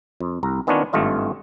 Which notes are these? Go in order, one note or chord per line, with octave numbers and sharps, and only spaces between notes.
F2
C2 A#5
D#3 B3 C#4 D4 F4 C#5
G#1 G2 A3 F4 D#5